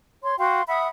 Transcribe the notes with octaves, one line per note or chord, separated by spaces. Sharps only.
C#5 C6
F#4 F5 G5 C6
E5 F#5 B5 D#6